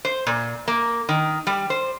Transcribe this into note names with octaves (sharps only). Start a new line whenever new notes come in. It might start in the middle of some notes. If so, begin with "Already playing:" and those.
C5
A#2
A#3
D#3
G3
C5